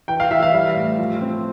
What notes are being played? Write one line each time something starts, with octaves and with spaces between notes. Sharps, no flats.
E3 G5
F5
E3 E5
F5
G3
A2
F3
C4